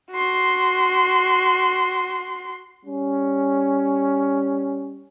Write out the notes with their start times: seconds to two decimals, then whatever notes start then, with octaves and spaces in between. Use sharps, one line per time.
0.11 F#4 C6
2.84 G3 C#4